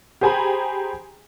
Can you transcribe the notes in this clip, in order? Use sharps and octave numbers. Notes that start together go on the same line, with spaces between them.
G4 G#4 C5 G#5 A#5 B5